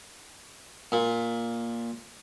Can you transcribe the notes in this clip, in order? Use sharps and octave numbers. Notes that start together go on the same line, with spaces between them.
A#2